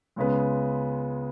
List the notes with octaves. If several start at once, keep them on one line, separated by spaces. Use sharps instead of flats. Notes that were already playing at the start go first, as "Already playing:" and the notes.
C#2 C#3 G#3 B3